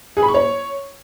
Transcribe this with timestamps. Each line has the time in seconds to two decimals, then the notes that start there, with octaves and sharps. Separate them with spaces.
0.17 G#4
0.23 B5
0.28 C#6
0.34 C#5